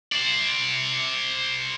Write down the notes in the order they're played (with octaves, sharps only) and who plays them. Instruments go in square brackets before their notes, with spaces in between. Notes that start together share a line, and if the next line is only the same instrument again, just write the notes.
[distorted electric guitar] C5 D5